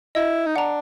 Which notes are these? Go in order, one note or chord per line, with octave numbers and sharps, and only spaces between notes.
E4 D#5
D#4
D4 F#5 A#5